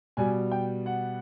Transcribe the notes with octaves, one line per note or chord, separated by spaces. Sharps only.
B2 G3 G#5
G5
F#5